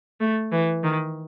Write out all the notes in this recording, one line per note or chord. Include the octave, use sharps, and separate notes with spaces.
A3
E3
D#3